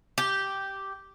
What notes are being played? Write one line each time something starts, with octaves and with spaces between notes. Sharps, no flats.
G4